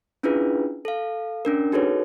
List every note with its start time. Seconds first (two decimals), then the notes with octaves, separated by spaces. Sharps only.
0.23 C#4 D4 E4 F4 G#4 B4
0.85 A4 F5
1.45 C#4 D4 A#4
1.72 D#4 F#4 G#4 A4 B4 C#5